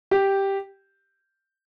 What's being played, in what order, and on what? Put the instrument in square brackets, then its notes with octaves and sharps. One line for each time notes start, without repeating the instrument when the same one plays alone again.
[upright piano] G4